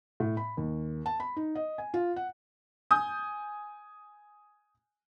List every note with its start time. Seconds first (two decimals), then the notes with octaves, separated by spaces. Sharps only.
0.20 A2
0.37 B5
0.57 D#2
1.06 A5
1.20 B5
1.36 D#4
1.55 D#5
1.78 G#5
1.94 F4
2.16 F#5
2.91 G#5 D#6 G6